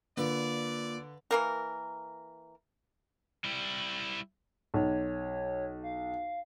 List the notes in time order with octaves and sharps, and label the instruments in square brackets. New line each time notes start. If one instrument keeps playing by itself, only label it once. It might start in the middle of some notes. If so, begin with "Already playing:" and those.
[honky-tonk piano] D3 [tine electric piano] A#3 F4 [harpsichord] B4 F5 [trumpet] D5
[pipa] E3 A#3 A#4
[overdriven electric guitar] G3 E4
[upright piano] B1 [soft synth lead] C#5
[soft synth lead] F5